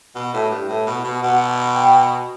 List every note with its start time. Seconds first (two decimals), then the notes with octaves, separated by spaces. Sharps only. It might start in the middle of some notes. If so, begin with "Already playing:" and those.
0.16 B2
0.34 A2
0.51 G2
0.69 A2
0.87 B2
1.04 B2
1.22 B2 F#5
1.75 G5